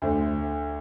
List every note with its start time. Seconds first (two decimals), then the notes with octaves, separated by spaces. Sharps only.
0.02 D2 D3 A3 C5